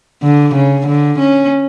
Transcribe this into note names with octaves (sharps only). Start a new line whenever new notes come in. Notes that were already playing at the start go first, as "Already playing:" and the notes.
D3
C#3
D3
C#4